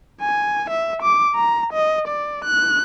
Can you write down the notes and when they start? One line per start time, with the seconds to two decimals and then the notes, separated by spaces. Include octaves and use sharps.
0.21 G#5
0.70 E5
1.02 D6
1.35 A#5
1.73 D#5
2.08 D5
2.45 F#6